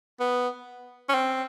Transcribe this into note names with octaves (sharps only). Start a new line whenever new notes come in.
B3
C#4
C4